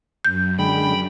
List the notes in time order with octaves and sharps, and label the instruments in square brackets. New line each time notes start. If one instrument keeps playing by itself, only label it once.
[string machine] F#2 [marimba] G6
[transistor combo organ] D3 G#3 [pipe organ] G5 B5